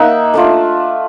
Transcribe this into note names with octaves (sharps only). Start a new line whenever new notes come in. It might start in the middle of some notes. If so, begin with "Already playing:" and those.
Already playing: A#3 D#4 E5 F#5
A3 D4 F4